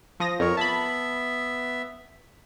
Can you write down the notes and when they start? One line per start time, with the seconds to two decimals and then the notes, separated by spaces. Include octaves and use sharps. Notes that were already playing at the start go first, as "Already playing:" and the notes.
0.20 F3 D#6 A#6
0.40 F2 A#4 C#5
0.57 B3 E5 A5 B5